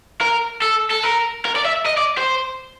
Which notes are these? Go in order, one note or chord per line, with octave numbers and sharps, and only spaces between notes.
A#4
A4
A4
A#4
A#4
D5
E5
D#5
D5
C5